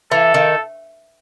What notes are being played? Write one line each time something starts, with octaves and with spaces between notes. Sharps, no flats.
E3 A4
D#3